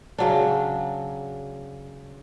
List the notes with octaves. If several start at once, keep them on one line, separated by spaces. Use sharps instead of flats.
C#3 F#3 D4